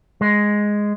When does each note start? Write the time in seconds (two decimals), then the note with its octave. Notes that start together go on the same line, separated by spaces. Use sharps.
0.21 G#3